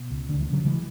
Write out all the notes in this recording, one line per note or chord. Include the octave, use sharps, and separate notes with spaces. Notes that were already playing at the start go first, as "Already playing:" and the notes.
Already playing: B2
C#2
D2 D3
E3
C#3
D3 F#3
C#3 E3 G#3